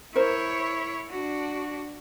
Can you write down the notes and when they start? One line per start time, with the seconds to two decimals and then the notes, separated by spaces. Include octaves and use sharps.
0.16 E4 A#4 C5 C#5
1.11 D4 F#4